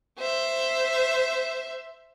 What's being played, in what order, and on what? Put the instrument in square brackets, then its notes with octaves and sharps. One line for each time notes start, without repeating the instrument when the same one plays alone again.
[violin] C5 E5